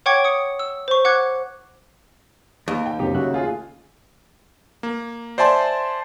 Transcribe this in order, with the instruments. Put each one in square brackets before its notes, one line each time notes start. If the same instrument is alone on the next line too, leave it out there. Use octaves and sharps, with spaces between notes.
[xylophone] C#5 F#5 G5 C#6 D6 G#6
D#6 C#7
E6
C5 C#6
F#5 D6 F#6 G#6
[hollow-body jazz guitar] D#2
[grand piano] G5
[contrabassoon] B1 [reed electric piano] F#2 C3 [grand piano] D#4 G4
[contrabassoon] C#3 [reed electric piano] F#4 E5 F#6
[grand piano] A3 F4 G#4
[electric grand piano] A#3
C5 D5 E5 G#5 A5 C6